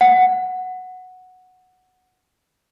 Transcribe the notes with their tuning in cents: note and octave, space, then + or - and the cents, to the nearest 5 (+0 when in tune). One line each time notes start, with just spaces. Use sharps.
F#5 -5